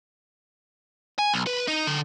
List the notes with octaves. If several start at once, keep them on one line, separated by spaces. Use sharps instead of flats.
G#5
B1
B4
D#4
D3